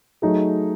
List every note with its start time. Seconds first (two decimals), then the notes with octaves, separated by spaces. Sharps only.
0.22 F#3 A3 D#4 G#4